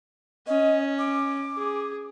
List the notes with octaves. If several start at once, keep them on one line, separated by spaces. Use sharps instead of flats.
C#4 D#5
D6
G#4